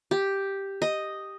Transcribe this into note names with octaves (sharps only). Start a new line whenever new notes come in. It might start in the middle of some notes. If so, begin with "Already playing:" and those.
G4
D#5